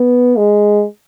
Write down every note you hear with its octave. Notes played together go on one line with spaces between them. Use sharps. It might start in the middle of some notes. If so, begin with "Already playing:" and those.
Already playing: B3
G#3